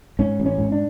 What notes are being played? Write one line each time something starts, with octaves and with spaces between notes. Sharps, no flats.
G#2 C#4
A1
C#4
G#2
D4